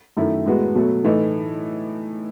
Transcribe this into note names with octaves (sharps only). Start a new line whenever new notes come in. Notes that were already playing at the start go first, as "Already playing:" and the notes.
F#2 D#3 A3 E4
A2 G#3 B3 F#4
B2 F#3 A3
A2 E3 A3 D#4